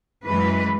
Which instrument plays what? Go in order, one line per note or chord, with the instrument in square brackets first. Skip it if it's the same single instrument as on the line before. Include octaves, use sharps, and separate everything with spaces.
[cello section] F#2 E3 G#3 B4